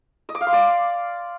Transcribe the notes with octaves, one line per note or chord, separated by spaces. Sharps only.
D#5
D6
F5
C6
D5